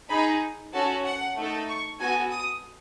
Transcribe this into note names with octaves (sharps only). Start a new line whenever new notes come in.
D#4 G#4 B5
C#4 F#4 A4 A5
F#5
A3 D#4 A4
C#6
B3 F#4 A4 G#5
D#6